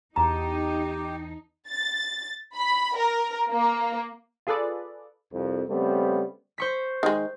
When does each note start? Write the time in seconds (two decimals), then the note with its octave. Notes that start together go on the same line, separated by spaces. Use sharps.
0.16 E2 D#4 G4 A5 A#5
1.70 A6
2.55 B5
2.96 A#4
3.50 A#3
4.47 F4 G#4 A4 B4 D5
5.33 C2 F2
5.68 C#3 G3 A3 B3 C4
6.58 C5 C#6 B6
7.03 D#3 G#3